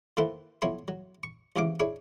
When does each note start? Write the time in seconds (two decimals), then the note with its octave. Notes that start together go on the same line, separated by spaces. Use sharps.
0.17 D#3 A#3 E4 A4 B4 C5
0.62 B1 F3 E4 C#5 C6
0.88 F#3
1.23 C#6
1.56 D#2 G#2 C#3 E3 F5 D6
1.80 D4 E4 G#4 C#5